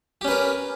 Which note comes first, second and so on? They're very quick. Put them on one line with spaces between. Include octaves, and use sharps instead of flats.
G4 C#4 B4 A#4